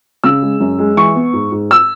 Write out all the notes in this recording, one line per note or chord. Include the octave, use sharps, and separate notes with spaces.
C#3 E6
G#3
F#2
G#3
E3 C#6
B3
G#2
G#2
E6